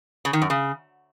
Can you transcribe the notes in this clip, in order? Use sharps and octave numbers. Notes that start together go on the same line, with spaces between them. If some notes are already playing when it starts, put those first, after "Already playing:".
C#3
D#3
F#2
C#3